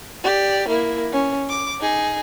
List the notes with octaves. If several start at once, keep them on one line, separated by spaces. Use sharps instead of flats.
G4 D5
A#3 E4
C#4
D6
D#4 G#4